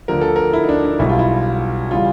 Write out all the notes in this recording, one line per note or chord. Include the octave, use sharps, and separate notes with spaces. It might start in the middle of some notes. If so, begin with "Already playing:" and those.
D2 D3 F3 A#4
A4
A#4
E4
D#4
D4
D4
B1 B2 G3 E4
F4
E4
C#3 E3 G3 F4